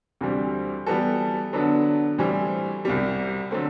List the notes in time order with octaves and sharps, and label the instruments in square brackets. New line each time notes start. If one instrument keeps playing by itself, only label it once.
[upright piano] D2 C3 E3 G3 C4
E3 G3 B3 F#4 A4
D3 F#3 B3 D4 A4
A2 E3 G3 C4
C2 C3 G3
D3 F#3 A3 C4